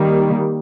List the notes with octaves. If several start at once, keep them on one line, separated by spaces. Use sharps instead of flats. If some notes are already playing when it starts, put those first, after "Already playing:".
Already playing: D#3 G3 A#3